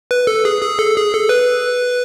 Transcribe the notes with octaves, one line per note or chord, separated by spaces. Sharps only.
B4
A4
G#4
G#4
A4
G#4
A4
B4